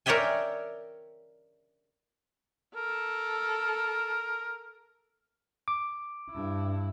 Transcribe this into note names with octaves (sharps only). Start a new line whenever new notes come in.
A#4 C#5 D5 E5 G5 G#5
A4 A#4
D6
G2 E4